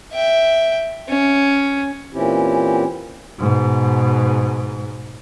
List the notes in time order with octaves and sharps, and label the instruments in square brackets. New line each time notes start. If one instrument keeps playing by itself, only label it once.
[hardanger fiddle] E5 G5
C#4
[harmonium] A#2 E3 C4 C#4 E4 G4
[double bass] G#2 B2